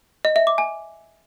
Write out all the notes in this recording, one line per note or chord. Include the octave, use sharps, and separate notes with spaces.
D#5
E5
D6
G#5